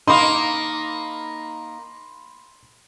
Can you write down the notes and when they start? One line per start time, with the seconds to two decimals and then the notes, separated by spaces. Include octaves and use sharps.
0.07 A#3 D#4 B5 C6